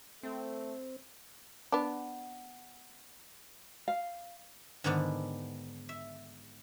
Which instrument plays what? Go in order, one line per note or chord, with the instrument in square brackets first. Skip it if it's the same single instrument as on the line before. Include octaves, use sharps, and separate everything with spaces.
[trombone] A3 [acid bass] C4
[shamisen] B3 D4
[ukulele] F5
[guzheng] G#2 D3 D#3 B3 D4
E5